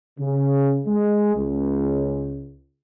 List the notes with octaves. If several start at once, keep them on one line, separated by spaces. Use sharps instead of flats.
C#3
G#3
C#2